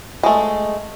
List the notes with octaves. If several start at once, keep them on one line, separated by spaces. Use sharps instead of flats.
G#3 A3